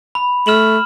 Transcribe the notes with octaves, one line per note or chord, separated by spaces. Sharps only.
B5
A3 F6 E7 F#7